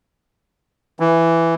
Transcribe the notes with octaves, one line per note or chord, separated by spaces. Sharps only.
E3